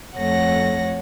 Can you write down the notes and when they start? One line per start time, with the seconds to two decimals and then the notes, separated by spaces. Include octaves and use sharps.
0.17 F2 A3 C#5 F#5 A#6